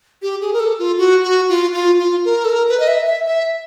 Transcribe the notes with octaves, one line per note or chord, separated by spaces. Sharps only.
G4
G#4
A#4
A4
F4
F#4
F#4
F4
F4
F4
A#4
A4
A#4
B4
D#5
E5
E5
E5